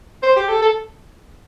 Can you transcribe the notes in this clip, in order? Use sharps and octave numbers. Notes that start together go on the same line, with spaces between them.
C5
G4
A4
A4